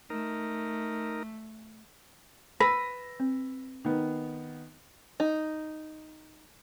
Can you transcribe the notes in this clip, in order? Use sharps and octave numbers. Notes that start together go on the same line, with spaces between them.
A3 D#4 A#4
B4 B5 E6 A#6
C4
D#3 B3
D#4